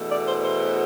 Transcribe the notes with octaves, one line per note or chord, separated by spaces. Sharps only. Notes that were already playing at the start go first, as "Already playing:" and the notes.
Already playing: E2 B2 A3
D5
C5
C5